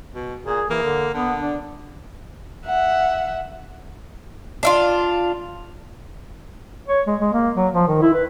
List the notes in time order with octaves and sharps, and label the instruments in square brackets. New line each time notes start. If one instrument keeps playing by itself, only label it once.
[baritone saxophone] B2
[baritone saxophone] A#2 [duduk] G#4
[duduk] E3 [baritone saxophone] A#3
[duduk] D3
[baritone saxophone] D3 [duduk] B3
[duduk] D4
[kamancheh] E5 F#5
[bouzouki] D4 E4 F4
[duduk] C#5
G#3
G#3
A#3
F#3
F3
D#3
E4
B4